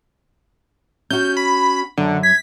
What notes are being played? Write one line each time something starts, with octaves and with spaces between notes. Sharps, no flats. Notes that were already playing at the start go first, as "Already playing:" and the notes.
C#4 F#4 G6
B5
F#2 D3
G#6 B6